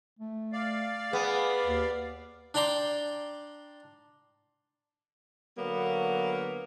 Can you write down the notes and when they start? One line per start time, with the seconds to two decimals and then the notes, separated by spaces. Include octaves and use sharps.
0.19 A3
0.53 D5 F5
1.13 B3 G#4
1.65 D#2
2.54 D4 D5 G5 A#5 C6 D6
5.58 D3 F#3 A#3 B3